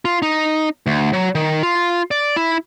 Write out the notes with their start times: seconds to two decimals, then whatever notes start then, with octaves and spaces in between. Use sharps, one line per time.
0.05 F4
0.22 D#4
0.87 D2
1.13 F#3
1.35 D#3
1.63 F4
2.11 D5
2.36 E4